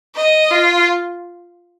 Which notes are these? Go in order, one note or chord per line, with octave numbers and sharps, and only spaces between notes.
D#5
F4